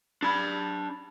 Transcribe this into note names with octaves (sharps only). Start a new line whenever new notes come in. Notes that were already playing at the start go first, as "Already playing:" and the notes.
D4 B5